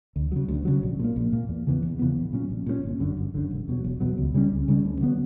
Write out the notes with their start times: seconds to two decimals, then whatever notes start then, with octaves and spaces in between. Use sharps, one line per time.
0.16 D2
0.32 C#3 F#3
0.48 D2
0.65 C#3 F#3
0.83 A#1
0.99 A#2 A#3
1.16 A#1
1.32 A#2 A#3
1.49 E2
1.67 C#3 E3 B3
1.82 E2
1.99 C#3 E3 B3
2.17 A#1
2.33 A#2 F#3 C#4
2.50 A#1
2.66 A#2 F#3 C#4
2.83 G1
3.00 F#2 D3
3.17 G1
3.34 F#2 D3
3.51 E1
3.68 E2 B2 F#3
3.84 E1
4.00 E2 B2 F#3
4.18 C#2
4.34 C#3 G3 C#4
4.52 C#2
4.68 C#3 G3 C#4
4.85 D2
5.01 D3 F#3 B3